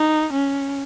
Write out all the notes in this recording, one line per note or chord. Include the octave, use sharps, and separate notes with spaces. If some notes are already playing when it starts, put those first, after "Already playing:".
Already playing: D#4
C#4